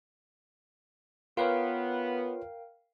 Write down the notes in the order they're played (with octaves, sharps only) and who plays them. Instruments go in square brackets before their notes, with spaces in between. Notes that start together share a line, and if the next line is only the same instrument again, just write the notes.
[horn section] B3 [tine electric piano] F4 B4 C#5 [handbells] A#4 F5 G5